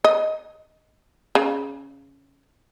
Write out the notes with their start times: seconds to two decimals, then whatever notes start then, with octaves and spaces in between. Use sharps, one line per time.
0.04 D#5
1.35 C#3